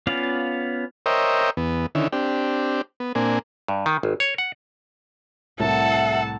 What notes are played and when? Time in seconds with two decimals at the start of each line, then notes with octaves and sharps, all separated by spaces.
0.07 B3 C#4 F4 D5 F5
1.06 A#4 C5 C#5 D#5 E5 G5
1.57 E2 B3
1.95 D3 D#3 C#4 E4
2.12 C4 D4 G4
3.00 B3
3.15 A#2 A#3 C4 D4 G#5
3.68 G2
3.86 D#3
4.03 G#1
4.20 C#5
4.38 F#5
5.60 C2 A2 A4 A#4 E5 F#5 A5